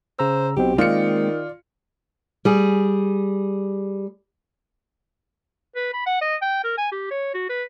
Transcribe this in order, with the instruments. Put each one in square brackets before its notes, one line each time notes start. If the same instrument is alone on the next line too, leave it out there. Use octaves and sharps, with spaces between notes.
[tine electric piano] C#3 A#5 E6 [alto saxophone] C5
[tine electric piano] B1 B2 C4 [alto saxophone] G4
[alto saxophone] D#3 [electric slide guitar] G#3 A#3 C4 [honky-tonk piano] F4 C#7 [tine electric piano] D5
[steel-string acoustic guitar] G3 G#4
[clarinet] B4
B5
F#5
D#5
G5
A#4
G#5
G4
C#5
F#4
B4